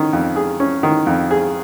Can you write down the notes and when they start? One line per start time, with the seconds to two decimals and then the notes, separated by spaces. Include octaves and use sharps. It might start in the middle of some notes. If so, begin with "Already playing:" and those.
Already playing: D#3 C#4
0.13 F2
0.36 G#4
0.60 C#4
0.83 D#3
1.06 F2
1.31 G#4